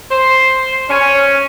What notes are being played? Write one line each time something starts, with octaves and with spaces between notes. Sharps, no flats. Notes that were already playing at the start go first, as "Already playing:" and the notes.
C5
C#4